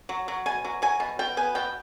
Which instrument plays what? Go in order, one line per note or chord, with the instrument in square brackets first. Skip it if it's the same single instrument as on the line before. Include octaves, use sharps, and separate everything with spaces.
[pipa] F#3
F#3
B2 G#5
F#3
F#3 G#5
B2
B2 G5
B3 G#5
B2 G5